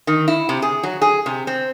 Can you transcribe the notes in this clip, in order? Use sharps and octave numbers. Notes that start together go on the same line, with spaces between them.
D#3
E4
C3
G#4
F#3
G#4
C3
C4